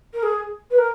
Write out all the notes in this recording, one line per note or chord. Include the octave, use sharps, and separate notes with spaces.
A#4
G#4
B4
A#4